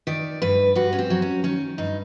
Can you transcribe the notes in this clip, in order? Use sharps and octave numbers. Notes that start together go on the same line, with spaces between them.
D#3 D5
G2 B4
G2 F#4
C#4
C4
F#3
C#4
D#3 C#4
G2 D#4